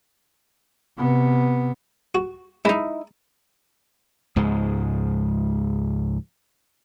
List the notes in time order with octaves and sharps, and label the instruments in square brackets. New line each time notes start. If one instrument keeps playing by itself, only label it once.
[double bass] C3 B3
[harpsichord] F#4
[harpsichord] G#3 [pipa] D#4 E4
[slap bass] C#2 G#2 F3 G#3